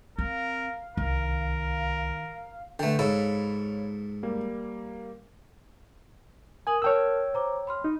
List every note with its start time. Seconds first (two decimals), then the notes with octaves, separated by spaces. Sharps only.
0.18 C4 A#4 F5
0.97 C2 D#3 A#4
2.79 D3 A3 B4 G5
2.99 G#2 A4 C#5 F5 B5
4.23 G3 A#3
6.67 A#4 G#5 D#6 F#7
6.82 A#4 C#5 G5 A5 E6 F6
7.34 C5 A#5 D6
7.67 B5 C6 F6
7.84 D#4